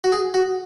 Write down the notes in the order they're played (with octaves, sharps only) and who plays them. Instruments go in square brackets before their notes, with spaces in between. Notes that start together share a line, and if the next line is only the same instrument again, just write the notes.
[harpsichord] F#4
G#4
F#4